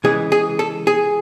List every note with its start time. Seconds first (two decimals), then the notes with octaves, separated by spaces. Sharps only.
0.04 C#3 E3 G#3 G#4
0.32 G#4
0.59 A4
0.87 G#4